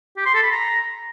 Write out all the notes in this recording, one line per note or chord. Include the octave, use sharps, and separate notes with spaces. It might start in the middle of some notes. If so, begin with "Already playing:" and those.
G4
C6
A4
B5
A#5